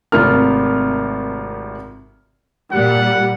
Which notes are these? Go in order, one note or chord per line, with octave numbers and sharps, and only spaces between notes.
G#1 C3 A3 F4 A#4 F6
A#2 G3 F#5